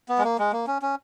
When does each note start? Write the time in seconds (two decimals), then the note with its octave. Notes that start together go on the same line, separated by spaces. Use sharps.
0.09 B3
0.18 G#3
0.24 A#3
0.39 G#3
0.52 A#3
0.67 C#4
0.82 C#4